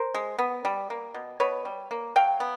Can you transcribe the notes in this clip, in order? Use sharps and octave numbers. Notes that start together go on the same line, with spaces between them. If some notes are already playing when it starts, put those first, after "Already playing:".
Already playing: A#4 C5
G#3
B3
G3
A#3
B2
B2 B4 C#5
G3
A#3
F#3 F5 G5
B3